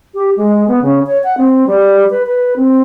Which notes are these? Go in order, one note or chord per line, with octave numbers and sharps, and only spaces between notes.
G4
G#3
B3
C#3
C#5
F#5
C4
G3
B4
B4
C4